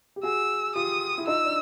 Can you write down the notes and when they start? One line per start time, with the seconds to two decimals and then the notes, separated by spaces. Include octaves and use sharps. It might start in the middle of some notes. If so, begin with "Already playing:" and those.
0.16 G4
0.23 F#4 G#4 E6
0.75 F4 G4 D#6
1.18 E4
1.27 D#4 F4 E6
1.45 D4